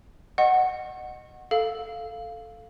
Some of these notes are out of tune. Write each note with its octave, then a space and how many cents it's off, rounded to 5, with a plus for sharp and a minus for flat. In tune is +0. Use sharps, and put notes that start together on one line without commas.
D#5 -20 F#5 +0 C#6 -30
A4 +0 F5 +0